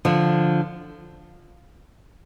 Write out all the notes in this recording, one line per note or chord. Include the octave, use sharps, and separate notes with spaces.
D3 F3